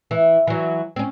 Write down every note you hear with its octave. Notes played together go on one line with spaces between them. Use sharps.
E3
E3 F#3
C4 C#4